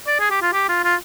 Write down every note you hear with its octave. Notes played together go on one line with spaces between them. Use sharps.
D5
G#4
G4
F4
G4
F4
F4